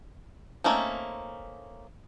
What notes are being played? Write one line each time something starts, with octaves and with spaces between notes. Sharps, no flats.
A3 A#3 C4 C#4 D#4